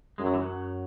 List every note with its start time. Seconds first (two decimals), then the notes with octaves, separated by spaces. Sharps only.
0.18 F#2 G#3
0.26 F#3
0.34 E3
0.40 F#2 F#3